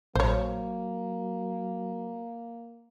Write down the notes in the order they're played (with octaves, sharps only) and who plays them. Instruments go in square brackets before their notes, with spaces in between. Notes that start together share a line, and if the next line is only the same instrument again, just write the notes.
[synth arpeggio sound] A#1 [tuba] F#3 [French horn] A#3 [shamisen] C5 C#5